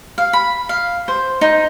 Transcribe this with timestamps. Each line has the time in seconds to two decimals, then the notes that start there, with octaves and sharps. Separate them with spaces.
0.18 F5
0.33 B5
0.69 F5
1.08 C5
1.41 D#4